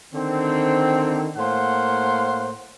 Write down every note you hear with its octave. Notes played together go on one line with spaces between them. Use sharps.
D3 D#3 C4
A2 A#3 C5 F5 F#5